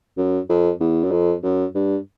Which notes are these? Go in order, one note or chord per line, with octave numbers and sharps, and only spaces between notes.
F#2
F2
E2
F#2
F2
F#2
G2